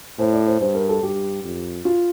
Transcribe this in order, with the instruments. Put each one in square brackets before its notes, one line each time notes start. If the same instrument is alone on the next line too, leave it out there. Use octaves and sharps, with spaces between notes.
[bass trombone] A2 [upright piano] C5
[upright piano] D5
C5
[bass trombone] G2 [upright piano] C5
[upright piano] A#4
A4
[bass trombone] G2 [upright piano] G4
[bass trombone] F2
[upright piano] F4